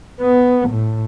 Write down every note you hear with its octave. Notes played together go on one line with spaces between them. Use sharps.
B3
A2